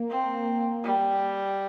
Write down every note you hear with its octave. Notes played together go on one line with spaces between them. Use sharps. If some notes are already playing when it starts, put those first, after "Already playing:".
Already playing: A#3
C4
G3